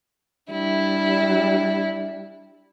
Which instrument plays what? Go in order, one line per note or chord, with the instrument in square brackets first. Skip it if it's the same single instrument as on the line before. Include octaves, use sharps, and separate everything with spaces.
[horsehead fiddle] G3 D4 [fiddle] E4